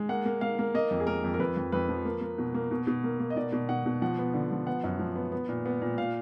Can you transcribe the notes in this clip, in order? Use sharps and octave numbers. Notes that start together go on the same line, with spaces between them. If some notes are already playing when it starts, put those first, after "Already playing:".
Already playing: G#3
A#3 F#5
A#3
A#3 F5
A#3
A#3 D#5
F2
G#4
A#3 A#4
F2
A#4
F2 B4
F2
F2 B4
F3
A#3
A#3
B2
A#3
B2
B2
A#3
A#3
D#5
B2 D5
B2
B2 F#5
B2
F3 F#5
B3
D3
F3
B3 F#5
F#2
F3
B3
B3
A#2
B3
A#2
A#2 F5